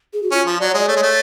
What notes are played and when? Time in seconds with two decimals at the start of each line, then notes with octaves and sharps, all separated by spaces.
0.13 G#4
0.23 F#4
0.31 C#4 F4
0.47 F3
0.59 F#3 D5
0.69 C#5
0.74 G#3 D5
0.88 A3 C#5
0.96 G#3
1.02 A3